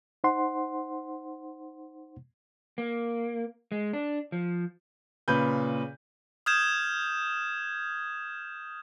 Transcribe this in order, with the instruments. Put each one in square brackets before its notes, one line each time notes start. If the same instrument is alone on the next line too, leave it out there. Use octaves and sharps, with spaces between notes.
[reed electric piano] D#4 C5 F#5 C6
[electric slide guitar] A#3
G#3
D4
F3
[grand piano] A#2 C#3 B4 G6
[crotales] D#6 F6 G6 G#6 E7